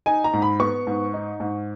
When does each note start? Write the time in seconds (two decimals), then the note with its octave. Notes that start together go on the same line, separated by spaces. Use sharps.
0.06 D#4 G#5
0.24 A#5
0.33 G#2
0.42 B5
0.60 B3 C#6
0.87 G#2
1.14 D#4
1.40 G#2